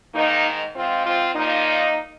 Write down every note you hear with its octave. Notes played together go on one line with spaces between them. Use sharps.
G#2 D#3 A#3 D#4
G#2 F3 C4 F4
C4 F4
A#2 F3 A#3 D#4